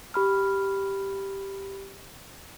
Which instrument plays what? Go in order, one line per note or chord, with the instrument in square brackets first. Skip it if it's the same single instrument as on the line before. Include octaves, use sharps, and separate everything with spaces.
[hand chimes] G4 B5 F6